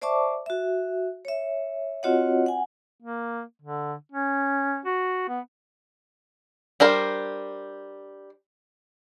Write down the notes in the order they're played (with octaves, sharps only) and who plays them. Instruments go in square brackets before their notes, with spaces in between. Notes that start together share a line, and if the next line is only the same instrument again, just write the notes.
[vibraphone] C5 D5 E5 A5 C#6 D6
F#4 E5
C#5 E5
C4 F4 F#4 C#5 D#5 F#5
F#5 G#5
[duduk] A#3
D3
C#4
F#4
B3
[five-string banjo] G3 D4 A#4 C5